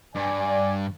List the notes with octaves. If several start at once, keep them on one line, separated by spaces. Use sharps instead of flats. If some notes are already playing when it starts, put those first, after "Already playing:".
G2 D5 G#5